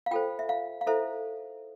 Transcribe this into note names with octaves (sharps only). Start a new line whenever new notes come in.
F5
F4 A4 C5 G5
E5
F5
F5
E4 A4 C5 E5